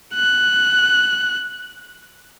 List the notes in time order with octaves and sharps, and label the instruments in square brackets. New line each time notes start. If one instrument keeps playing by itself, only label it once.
[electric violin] F#6